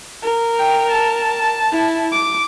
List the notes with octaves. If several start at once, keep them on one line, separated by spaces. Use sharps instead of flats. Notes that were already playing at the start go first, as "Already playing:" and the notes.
A#4
G5
A5
E4
D6